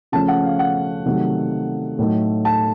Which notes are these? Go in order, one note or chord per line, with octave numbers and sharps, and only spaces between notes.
C#3 F3 A3 C#4 A5
F#5
F5
F#5
C3 D#3 F#3 A3
A2 F#3 A3 D#4
A5